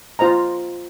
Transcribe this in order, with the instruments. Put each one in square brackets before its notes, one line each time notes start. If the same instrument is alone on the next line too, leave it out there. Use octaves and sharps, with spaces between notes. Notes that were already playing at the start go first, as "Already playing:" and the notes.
[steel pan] F4 C5 D#5 A#5